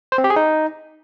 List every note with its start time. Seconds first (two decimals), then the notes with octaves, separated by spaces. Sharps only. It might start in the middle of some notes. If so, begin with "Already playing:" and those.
0.12 C5
0.18 C4
0.24 G4
0.30 G#4
0.36 D#4